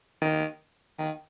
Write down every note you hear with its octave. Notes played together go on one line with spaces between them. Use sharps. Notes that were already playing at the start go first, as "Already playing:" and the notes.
D#3
D#3